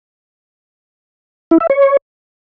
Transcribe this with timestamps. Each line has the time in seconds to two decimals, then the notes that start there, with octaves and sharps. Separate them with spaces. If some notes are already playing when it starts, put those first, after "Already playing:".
1.51 E4
1.60 E5
1.70 C#5